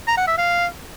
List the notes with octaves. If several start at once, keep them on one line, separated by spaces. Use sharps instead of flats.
A#5
F#5
E5
F5